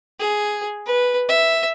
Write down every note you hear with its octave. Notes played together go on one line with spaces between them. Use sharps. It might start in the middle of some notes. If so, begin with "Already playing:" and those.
G#4
B4
E5